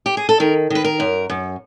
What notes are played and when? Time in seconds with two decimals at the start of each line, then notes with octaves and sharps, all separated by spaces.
0.06 G4
0.17 G#4
0.29 A4
0.40 D#3 A#4
0.70 D#3 B4
0.84 A#4
1.00 F#2
1.30 F#2